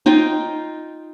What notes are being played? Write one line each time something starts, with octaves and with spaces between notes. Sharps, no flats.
D#4 F4 D#5 G5